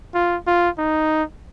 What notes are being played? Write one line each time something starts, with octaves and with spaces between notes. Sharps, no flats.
F4
F4
D#4